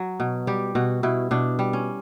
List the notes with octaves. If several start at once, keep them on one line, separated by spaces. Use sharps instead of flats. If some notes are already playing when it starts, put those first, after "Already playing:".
Already playing: F#3 F#4
B2
G3 G4
B2 F#4
B2 E4
B2 D4
G3
C#4